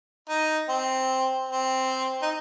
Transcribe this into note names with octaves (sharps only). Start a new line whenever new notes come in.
D#4
C4
C4
D#4